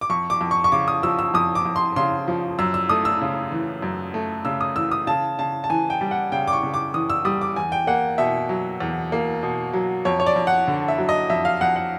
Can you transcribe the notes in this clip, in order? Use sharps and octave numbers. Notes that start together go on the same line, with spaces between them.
D6
F2 C#6
D6
F2
C#6
C#6
C#3 D6
D#6
F3 E6
E6
F2 D#6
D6
F2
C6
C#3 C6
F3
F#2 E6
E6
A3 D#6
E6
C#3
E3
F#2
A3
C#3 E6
D#6
E3 E6
D#6
C#3 A5
C#3 A5
A5
E3 G#5
G5
G3
F#5
C#3 G5
D6
C#6
C#3
D6
E3 D#6
E6
G3 D#6
D6
E2 G#5
G5
A#3 F#5
B2 E5
F#3
E2
A#3
B2
F#3
F2 C#5
C#5
D5
F2
F#5
D3
E5
F#3
D#5
F2 E5
F5
F2 F#5
F#5